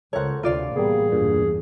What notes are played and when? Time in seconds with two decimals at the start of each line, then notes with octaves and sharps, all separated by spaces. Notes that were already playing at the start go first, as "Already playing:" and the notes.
0.13 C#2 A4 A#4 C5 C#5 F#5
0.43 D2 C3 F4 D5 F5
0.76 A1 G3 A#3 B3 G#4
1.12 G1 E2 G2 A#2